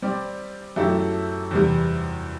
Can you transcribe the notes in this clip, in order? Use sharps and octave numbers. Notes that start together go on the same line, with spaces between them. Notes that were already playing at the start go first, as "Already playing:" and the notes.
G3 C4 G4 D5
F#2 F#3 A3 E4 G4
E2 C3 G3